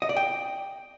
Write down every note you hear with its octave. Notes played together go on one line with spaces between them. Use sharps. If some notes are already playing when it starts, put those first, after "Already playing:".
D#5
D5
G5